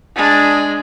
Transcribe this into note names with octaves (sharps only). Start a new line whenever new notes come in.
G#3 D4